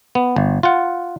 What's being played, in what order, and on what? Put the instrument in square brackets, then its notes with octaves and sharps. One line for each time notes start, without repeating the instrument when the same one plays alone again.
[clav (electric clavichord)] B3
G1
F4 F#5